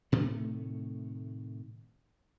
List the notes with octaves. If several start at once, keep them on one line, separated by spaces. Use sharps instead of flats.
A2 C3 D#3 A3